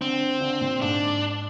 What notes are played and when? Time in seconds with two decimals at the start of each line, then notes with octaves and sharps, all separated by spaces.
0.01 D3 C4
0.41 D3
0.61 A#2
0.81 G#2 D4